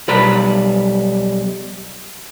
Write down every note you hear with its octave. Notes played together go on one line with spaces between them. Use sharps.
B1 G3 B4 D5 A#5 B5